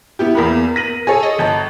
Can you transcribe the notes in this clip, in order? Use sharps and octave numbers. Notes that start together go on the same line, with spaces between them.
B3 E4 G4
E2 A#3 B3 A#4 B5
A#6 D#7 F#7
G#4 A4 C#5
D#5
G1 A5